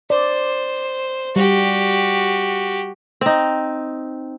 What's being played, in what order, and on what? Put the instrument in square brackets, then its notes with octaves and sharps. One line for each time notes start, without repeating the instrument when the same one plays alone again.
[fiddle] C5 [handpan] D5
[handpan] G3 [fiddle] F#4 G4
[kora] C4 D#4